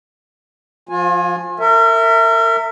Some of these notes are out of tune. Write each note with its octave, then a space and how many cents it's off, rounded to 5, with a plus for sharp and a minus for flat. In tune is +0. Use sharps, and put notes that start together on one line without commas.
F3 +0 F4 +40 G#5 +0
A#4 -35 E5 +0